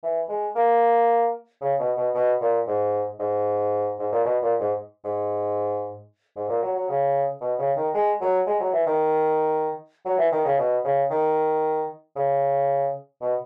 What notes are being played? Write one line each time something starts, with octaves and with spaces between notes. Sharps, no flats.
E3
G#3
A#3
C#3
B2
B2
B2
A#2
G#2
G#2
G#2
A#2
B2
A#2
G#2
G#2
G#2
A#2
F#3
F#3
C#3
B2
C#3
D#3
G#3
F#3
G#3
F#3
E3
D#3
F#3
E3
D#3
C#3
B2
C#3
D#3
C#3
B2